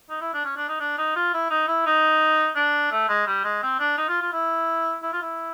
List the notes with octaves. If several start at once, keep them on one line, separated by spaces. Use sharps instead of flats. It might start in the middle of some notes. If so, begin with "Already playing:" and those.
D#4
E4
D4
C#4
D4
D#4
D4
D#4
F4
E4
D#4
E4
D#4
D4
A3
G#3
G3
G#3
C4
D4
D#4
F4
F4
E4
E4
F4
E4